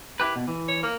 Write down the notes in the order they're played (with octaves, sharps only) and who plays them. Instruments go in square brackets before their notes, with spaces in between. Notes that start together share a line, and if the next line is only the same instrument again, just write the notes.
[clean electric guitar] E4 G4 B4
B2
E3
[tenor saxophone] C#5
A#3